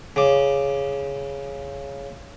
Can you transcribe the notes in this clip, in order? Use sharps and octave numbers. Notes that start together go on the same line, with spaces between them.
C#3 D6